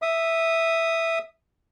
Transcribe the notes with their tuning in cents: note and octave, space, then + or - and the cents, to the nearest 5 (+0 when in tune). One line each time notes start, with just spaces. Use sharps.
E5 +0 D#6 -10